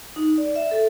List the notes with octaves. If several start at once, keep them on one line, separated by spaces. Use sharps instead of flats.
D#4
D5
E5
A4